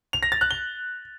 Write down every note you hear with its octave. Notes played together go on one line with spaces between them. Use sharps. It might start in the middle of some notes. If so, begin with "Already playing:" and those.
F7
A#6
A6
F#6
G7